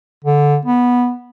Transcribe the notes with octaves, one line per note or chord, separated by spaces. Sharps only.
D3
B3